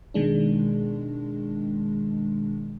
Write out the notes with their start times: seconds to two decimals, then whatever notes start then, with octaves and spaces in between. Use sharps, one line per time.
0.14 B2 D#3 G#3 D4